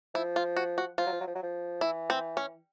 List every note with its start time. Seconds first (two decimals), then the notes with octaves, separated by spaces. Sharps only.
0.15 F3 E4
0.36 F4
0.56 F#4
0.78 F#4
0.98 F3 F4
1.06 F#3
1.12 F3
1.21 F#3
1.27 F3
1.35 F#3
1.43 F3
1.81 E3 E4
2.10 C4
2.37 C#4